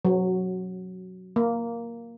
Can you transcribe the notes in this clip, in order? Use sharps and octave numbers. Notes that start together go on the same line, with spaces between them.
F#3
A#3